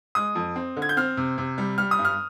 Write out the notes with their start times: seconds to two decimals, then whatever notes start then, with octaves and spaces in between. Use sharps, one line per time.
0.15 G#3 D#6
0.35 F2
0.56 C4
0.77 D3
0.82 G#6
0.89 G6
0.97 C4 F6
1.17 C3
1.38 C3
1.58 G3
1.78 G3 F6
1.91 D#6
1.99 G2
2.05 F6